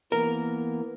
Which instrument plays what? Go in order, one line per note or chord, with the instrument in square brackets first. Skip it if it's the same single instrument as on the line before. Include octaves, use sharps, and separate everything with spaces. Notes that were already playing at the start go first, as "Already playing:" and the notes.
[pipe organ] E3 A#3 B3 [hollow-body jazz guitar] A#4